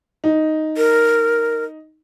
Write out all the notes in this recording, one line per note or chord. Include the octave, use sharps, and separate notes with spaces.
D#4
A#4